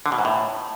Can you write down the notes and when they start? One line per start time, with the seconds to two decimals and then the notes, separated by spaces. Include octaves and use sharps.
0.06 D3
0.12 B2
0.19 G#2
0.25 A2